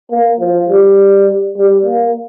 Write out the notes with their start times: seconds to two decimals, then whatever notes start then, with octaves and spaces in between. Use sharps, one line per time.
0.11 A#3
0.39 F3
0.69 G3
1.57 G3
1.86 A#3